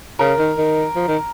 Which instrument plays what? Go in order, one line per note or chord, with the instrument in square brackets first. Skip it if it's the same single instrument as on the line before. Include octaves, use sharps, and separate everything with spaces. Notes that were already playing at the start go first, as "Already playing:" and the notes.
[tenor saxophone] C#3 [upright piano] A#4
[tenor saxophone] D#3
D#3
F3
D#3